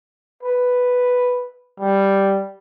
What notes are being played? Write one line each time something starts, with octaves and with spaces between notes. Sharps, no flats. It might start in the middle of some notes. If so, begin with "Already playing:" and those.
B4
G3